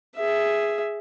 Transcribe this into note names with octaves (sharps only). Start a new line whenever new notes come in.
G#4 E5